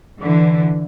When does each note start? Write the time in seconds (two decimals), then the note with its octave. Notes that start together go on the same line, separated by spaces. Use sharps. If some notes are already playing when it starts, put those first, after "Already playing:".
0.21 D3 E3